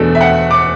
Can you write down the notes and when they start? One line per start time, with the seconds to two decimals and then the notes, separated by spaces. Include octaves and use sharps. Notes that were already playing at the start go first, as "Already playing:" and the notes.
Already playing: E2 B2 A3 D4 F#4 A4
0.15 E5
0.21 F#5
0.51 D6